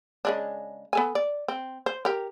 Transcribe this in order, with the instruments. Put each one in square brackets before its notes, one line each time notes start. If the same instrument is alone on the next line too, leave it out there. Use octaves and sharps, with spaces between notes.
[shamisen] C#3 G#3 D4
B3 A4 G#5
D5
C4
C5
G4 A#4